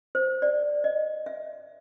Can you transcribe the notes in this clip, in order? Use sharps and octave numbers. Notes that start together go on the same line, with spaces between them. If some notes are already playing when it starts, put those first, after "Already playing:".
C5
D5
D#5
E5